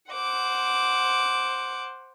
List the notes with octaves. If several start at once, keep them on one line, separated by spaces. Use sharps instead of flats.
C5 F#5 D6